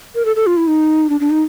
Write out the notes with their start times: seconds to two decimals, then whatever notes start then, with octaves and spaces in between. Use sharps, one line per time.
0.15 A#4
0.25 A4
0.36 A4
0.47 F4
0.57 E4
0.68 D#4
1.09 D4
1.20 D4
1.30 D#4